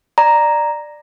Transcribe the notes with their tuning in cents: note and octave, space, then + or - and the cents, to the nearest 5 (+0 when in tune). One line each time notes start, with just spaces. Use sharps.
D5 +15 A#5 +0